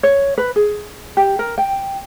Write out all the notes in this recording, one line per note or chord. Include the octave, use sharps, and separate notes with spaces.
C#5
B4
G#4
G4
A#4
G5